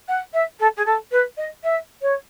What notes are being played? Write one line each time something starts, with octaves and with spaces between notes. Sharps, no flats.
F#5
E5
A4
G#4
A4
B4
D#5
E5
C#5